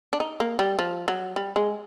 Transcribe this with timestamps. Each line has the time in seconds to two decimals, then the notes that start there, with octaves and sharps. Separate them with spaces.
0.13 D4
0.20 D#4
0.40 A#3
0.59 G3
0.79 F3
1.08 F#3
1.36 G3
1.56 G#3